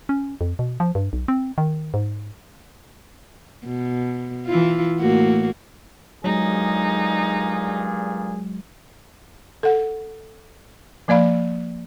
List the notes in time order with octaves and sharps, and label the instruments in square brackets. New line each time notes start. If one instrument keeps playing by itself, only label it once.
[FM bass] C#4
F2
B2
F3
G2
B1
C4
D#3
G#2
[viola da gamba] B2
E3 E4 F4
A2 A#3 F#4
[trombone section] G2 A#2 G#4 [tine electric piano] F#3 G#3 [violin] D#4
[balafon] A4 F#5
F3 A#3 D5 F5 B5